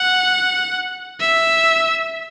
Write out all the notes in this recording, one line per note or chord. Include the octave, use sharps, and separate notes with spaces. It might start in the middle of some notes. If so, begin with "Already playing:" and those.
Already playing: F#5
E5